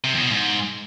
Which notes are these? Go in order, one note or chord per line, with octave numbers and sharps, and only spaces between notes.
C3
E2
B2
G#2